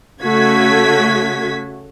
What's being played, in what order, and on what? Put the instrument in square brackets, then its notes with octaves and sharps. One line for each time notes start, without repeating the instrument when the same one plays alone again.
[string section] C#3 A3 F#4 G#6 B6